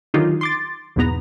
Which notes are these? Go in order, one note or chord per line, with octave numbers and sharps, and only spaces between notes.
D3 D#3 F#3 D#4 F4 G4
C6 D6 A6
B1 E2 G#2 B3 A#5